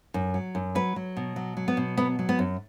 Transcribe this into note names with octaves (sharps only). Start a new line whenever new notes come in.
F#2
F#3
F#2
F#3 B4
F#3
B2
F#3
F#3
B3
B2
F#3 B3
F#3
B3
F#2